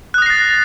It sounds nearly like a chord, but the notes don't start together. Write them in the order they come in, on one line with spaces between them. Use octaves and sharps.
F#6 D#6 A#6 C7 A6